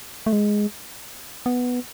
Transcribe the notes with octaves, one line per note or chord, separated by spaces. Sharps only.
A3
G#3
B3